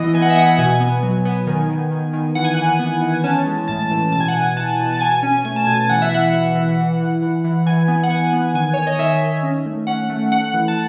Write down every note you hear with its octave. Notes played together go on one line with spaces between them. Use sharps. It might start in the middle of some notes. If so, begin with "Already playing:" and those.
Already playing: E3 B3 D#5
B3 G#5
F#5
E5
B3 F#5
B2 G#5
B3
F#3
B3
D#3
D#3
D#3
D#3
E3 F#5
G#5
E3 F#5
B3
E3
G#5
C#4 A5
G#3
A2 A5
E3
B2 A5
G#5
F#5
B2 G#5
B2 A5
B2
A5
B2 G#5
C#4
A3 G#5
A5
B2 G#5
E3 F#5
E5
E3 F#5
E3
E3
E3
E3
E3
E3
E3 G#5
B3
F#5
E3 G#5
B3
D#3 G#5
D#3 C#5
D#5
D#3 E5
D#3
C#4
A3
C#4 F#5
A3
A3 F#5
E3
A5